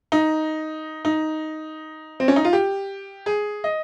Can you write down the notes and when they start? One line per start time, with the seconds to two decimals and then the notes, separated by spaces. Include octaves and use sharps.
0.12 D#4
1.05 D#4
2.20 C4
2.28 C#4
2.36 D#4
2.45 F4
2.53 G4
3.26 G#4
3.64 D#5